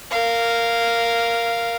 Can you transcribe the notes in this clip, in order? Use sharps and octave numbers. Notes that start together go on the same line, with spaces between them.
A#4 F5